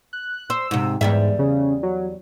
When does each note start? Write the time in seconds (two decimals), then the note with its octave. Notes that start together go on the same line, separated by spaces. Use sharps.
0.13 F#6
0.50 C5 E6
0.71 G#2 C3
1.01 E2 G#2 G3 E5
1.39 C#3
1.83 F#3